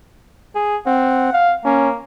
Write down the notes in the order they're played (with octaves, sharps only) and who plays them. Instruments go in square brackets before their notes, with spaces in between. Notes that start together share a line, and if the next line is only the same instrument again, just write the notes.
[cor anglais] G#4
[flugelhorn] C4 [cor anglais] F#5
[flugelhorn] F5
[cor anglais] A#3 [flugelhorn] C#4